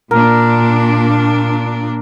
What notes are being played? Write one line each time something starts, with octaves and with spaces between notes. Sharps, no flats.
A#2 D4 A#4